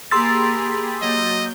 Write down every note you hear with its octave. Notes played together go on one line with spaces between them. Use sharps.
A#3 G4 G#4 A#4 B5 C6 E6 A6
F#3 A#3 D#5 G6